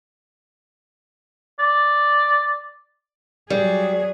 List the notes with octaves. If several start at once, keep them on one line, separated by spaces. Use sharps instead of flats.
D5
F#3 G3 G#4